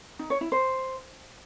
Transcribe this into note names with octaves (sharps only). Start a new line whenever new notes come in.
D#4
C#5
E4
C5